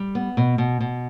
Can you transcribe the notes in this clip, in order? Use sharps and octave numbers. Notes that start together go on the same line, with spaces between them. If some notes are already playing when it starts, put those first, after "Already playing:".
Already playing: G3
B3
B2
B2
B2